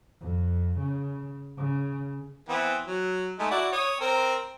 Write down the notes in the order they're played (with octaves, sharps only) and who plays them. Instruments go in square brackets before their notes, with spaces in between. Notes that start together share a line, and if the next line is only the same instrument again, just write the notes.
[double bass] F2
C#3
C#3
[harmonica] E3 B3 C4
F#3
G#3 A3 D#4
E4 F#4 D5
C#5 D#6
C4 A#4